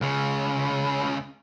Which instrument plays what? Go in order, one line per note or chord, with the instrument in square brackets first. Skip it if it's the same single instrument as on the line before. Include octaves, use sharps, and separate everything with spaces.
[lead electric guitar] C#2 C#3